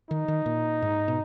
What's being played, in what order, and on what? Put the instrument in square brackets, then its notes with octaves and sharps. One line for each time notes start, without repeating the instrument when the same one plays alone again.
[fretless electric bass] D#3 [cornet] D#4
[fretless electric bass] D#3
A#2
G#2
B2